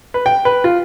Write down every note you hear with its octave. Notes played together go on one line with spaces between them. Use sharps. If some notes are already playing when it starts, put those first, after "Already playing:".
B4
G5
B4
F4